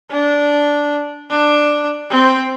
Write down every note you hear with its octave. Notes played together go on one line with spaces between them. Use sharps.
D4
D4
C4